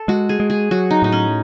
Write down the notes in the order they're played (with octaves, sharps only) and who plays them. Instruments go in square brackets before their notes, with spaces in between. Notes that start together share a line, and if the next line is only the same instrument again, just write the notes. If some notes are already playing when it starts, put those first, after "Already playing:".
Already playing: [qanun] A4
[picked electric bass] G#3 [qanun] F#4
[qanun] G#4
[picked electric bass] G#3
[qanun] G#4
[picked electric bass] F#3 [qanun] F#4
[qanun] D#4
[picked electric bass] A2 [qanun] D#4
[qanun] C#4